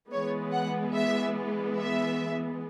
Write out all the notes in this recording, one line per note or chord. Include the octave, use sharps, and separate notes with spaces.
E3 G#3 B3 C#5
F#5
E5
E5